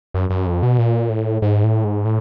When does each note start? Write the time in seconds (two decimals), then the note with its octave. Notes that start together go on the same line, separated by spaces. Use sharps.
0.14 F#2
0.30 F#2
0.47 F2
0.63 B2
0.78 A#2
1.09 A2
1.42 G#2
1.64 A2
1.84 G#2
2.05 A2